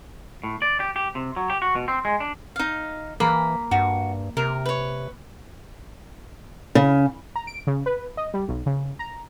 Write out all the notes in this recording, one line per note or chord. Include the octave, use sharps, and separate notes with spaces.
A2
D5
G4
G4
C3
F#3
G4
F#4
B2
C4
G#3
D4
D#4 F5
E3 A#3 B5
G2 F#4
C3 A#4
B4 C#5
C#3
A#5
D7
C#3
B4
D#5
G3
B1
C#3
A#5